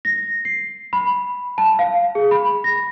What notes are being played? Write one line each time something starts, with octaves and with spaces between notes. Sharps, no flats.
A#6
C7
B5
A5
F5
G#4
B5
A#6